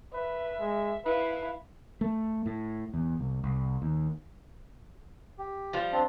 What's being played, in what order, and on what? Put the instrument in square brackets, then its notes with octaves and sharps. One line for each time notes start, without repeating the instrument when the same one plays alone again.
[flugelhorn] B4 [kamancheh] E5
[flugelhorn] G#3
[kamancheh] E4 F5 [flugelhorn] B4
[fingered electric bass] A3
A2
E2
C2
C2
D#2
[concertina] G4
[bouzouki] F3 G3 F4
[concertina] C4 D4